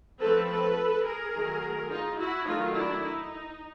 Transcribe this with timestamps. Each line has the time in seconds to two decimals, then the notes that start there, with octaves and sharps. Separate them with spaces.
0.21 F3 A3 C4 A4 B4
0.50 A4 B4
1.06 G#4 A#4
1.34 D#3 F#3 A3
1.90 D#4 F4
2.19 E4 F#4
2.47 D#3 F#3 A3 D#4 F4
2.76 D4 E4
3.04 D#4